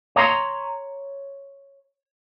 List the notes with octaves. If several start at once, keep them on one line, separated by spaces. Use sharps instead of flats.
C#5 A#5 C6